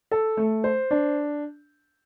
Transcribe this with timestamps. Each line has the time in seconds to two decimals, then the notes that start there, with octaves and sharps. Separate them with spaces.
0.11 A4
0.37 A3
0.64 C5
0.91 D4